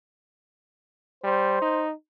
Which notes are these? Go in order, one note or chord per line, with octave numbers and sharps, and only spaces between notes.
G3 C5
D#4